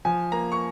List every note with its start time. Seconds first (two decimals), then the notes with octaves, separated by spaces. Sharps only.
0.05 F3 G#5
0.32 A#3 A#5
0.52 C#6